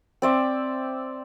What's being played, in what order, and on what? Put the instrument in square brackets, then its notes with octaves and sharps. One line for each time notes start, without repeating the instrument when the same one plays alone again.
[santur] C4 D5 E5